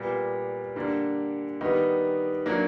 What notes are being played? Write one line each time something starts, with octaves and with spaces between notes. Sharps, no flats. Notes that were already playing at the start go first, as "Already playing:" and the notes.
Already playing: A#2 G3 B3
D3 G3 A#3 D4
D#3 G3 B3 D#4
F#3 A#3 D4